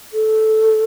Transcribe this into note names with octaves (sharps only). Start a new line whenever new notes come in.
A4